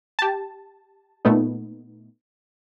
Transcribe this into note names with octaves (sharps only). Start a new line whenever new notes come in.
G4 A5
A#2 A3 B3 D#4